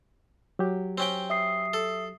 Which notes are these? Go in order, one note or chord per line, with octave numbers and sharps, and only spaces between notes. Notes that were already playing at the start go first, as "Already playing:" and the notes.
F#3 G4
C4 C#4 G5
E5 D#6 C7
A4